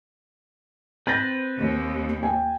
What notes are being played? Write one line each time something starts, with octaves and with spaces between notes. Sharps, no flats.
C4 B4 G6 A6 A#6
D#2
G5 G#5